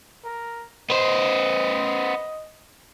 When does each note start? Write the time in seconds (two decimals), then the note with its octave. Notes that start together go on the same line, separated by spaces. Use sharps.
0.25 A#4
0.90 B3 C5 D#5